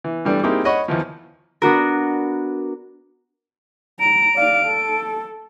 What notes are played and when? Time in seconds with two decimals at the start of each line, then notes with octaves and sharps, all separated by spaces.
0.04 E3
0.25 G2 E3 G3 A3 D4
0.43 A#3 C4 D#4 E4 G4 G#4
0.65 C#5 D#5 F#5 B5 C#6
0.88 D#2 E3 F3
1.62 B3 D4 F#4 A#4
4.00 A#5 D7
4.35 D5 F5
4.65 A4